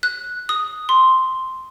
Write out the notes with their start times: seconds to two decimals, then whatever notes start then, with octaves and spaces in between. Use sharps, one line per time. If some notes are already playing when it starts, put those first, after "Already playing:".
0.03 F#6
0.49 D#6
0.89 C6